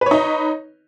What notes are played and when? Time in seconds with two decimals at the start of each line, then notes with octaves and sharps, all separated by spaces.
0.01 B4
0.06 C#5
0.11 D#4